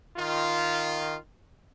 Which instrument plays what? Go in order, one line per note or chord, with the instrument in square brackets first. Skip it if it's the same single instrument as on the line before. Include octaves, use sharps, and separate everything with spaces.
[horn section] D#3 F4